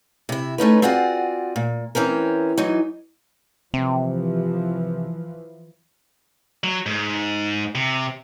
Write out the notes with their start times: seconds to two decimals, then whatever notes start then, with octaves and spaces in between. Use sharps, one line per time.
0.29 C3 E4
0.58 A3 C#4 D#4 B4
0.82 C4 F4 F#4 G#4 D5 F#5
1.56 A#2
1.95 E3 C4 C#4 A#4
2.58 E3 F#3 D#4
3.74 C3 E3 F3
6.64 F#3
6.86 G#2
7.75 C3